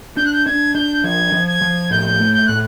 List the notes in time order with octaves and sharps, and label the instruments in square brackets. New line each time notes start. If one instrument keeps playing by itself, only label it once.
[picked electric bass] D4 [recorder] G6
[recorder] F#6
G6
[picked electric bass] D4 [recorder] G#6
[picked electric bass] D4 [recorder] G6
[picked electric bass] F3 [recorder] G#6
[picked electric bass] F3
[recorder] G#6
[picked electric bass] F3
[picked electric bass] A2 [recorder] G6
[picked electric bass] A3
[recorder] G6
[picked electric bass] A2 [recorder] F#6